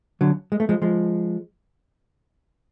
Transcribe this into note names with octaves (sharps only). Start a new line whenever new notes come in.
D3 F#3
G#3
A3
F3 G#3
F3 G#3